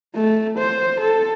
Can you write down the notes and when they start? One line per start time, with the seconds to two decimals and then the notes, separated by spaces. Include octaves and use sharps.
0.16 A3
0.59 C5
1.01 A4